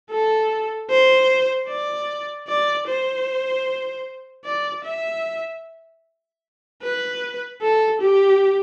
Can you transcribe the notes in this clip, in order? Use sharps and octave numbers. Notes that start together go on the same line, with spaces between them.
A4
C5
D5
D5
C5
D5
E5
B4
A4
G4